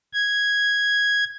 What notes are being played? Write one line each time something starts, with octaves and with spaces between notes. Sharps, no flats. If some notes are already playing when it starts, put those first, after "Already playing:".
G#6